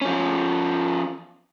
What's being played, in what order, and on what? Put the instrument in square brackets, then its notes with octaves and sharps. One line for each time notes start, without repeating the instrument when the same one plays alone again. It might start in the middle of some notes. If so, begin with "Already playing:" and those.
[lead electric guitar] F3 C#4